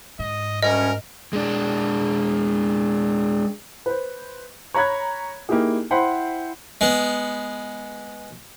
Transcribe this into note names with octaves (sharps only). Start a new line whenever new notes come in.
G#2 D#5
D2 G3 C#4 A#4 D#5
G#3 D4
B4 C5
C#5 A#5 B5 F#6 G#6
A#3 D#4 E4 G4 G#4
E4 C5 F#5 G5 B5 C6
G#3 B3